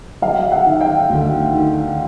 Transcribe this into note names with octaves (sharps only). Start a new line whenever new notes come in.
F#3 D#5 F5
E5 F#5
D#3
F5 G5
D2
D#3